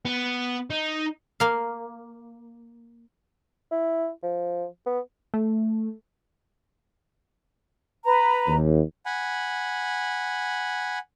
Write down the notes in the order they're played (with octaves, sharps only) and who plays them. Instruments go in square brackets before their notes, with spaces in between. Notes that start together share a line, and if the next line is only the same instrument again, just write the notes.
[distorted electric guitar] B3
D#4
[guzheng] A#3 F5
[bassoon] E4
F3
B3
[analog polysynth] A3
[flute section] B4 A#5
[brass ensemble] D#2
[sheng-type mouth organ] F#5 G#5 B5